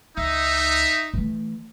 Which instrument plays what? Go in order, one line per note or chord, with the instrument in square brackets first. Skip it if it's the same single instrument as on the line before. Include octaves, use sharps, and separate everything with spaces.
[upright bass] C#2 [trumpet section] D#4 E5
[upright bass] E3 A3